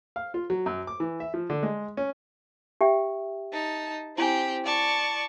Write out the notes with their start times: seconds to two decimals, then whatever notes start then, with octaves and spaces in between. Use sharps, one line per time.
0.16 F5
0.34 F4
0.50 F#3
0.66 F#2
0.87 D6
1.00 E3
1.20 E5
1.34 F3
1.50 D3
1.63 G#3
1.97 C#4
2.81 G4 E5 G5
3.53 D#4 A5
4.18 C4 E4 G4 G#5
4.64 D5 A5 C#6